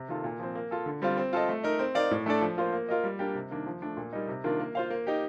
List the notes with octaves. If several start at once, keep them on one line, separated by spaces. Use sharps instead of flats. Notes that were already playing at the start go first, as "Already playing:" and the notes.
Already playing: C3
D#3 A#3 F4 A4
A#2
F3 C4
A#3
F4 A4
D3
G3 C4 F4
C4
F4 A4 D#5
A3
D#4 A#4
C4
D#4 A#4 D5 F5
A2
A3 D4 A4 D5
F3
A#3 F4 C5
A#3
F4 A#4 D#5
G3
A#3 D4 G4 A#4
C3
D#3 A#3 D4
F3
A3 D4
A#2
G3 A#3 D#4
C3
D#3 A#3 D4 F4
A#3
F4 C5 F5
A#3
D#4 G4